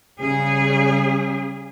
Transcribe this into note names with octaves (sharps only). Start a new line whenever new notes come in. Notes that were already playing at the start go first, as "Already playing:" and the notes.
C#3 G3 G#4